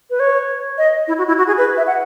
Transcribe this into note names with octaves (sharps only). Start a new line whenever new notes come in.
B4
C#5
D#5
E4
F#4
E4
F#4
G#4
B4
E5
F#5